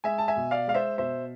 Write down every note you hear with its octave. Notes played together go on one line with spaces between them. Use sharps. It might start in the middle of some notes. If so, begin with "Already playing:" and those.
G#3 E5 G#5
A5
E5 G#5
B2
D5 F5
G#3 F5
C5 E5
B2 C5 E5